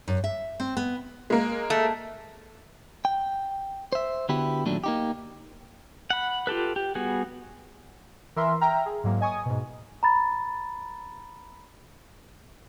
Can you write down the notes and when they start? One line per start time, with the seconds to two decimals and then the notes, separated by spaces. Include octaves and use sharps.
0.08 F#2
0.24 E5
0.60 C4
0.77 B3
1.30 G#3 A#3
1.70 A3
3.05 G5
3.93 C5 E5
4.29 D3 B3 E4 F#4 G4
4.66 D#2 A#2 F#3 A3 D4
4.84 A#3 D#4 G4
6.10 F#5 B5
6.47 F4 G4 A4 B4
6.76 G4
6.95 G3 B3 F#4 G#4
8.36 E3 A#4 E5 C6
8.61 E5 G5 A#5 F6
8.86 G#4
9.04 G#2 F#3 A#3
9.20 D#5 G#5 C#6 D#6
9.46 G#2 B2
10.03 A#5 B5 A6